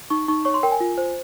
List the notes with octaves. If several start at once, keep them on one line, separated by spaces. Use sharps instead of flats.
D#4 C#6
D#4 C#6
C#5 C#6
C6
A#4 G5
G#5
F4
C5